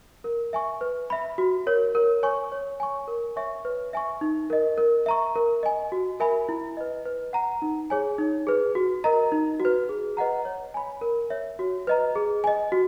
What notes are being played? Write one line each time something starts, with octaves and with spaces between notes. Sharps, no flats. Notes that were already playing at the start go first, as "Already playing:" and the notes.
A#4
E5 G#5 C#6
B4
E5 B5
F#4
A#4 C#5
A#4
C#5 G#5 C#6
C#5
G#5 C#6
A#4
C#5 E5 G#5 C#6
B4
E5 G#5 C#6
D#4
A#4 D#5
A#4
E5 A#5 C#6
A#4
D#5 G#5
F#4
A#4 E5 G#5 B5
E4
B4 D#5
B4
F#5 A#5
D#4
G#4 C#5 G#5
D#4
G#4 B4
F#4
A#4 D#5 A#5
D#4
F#4
B4
G#4
B4 D#5 F#5 A#5
C#5
G#5 B5
A#4
C#5 E5
F#4
B4 D#5 A#5
G#4
D#5 G#5
F#4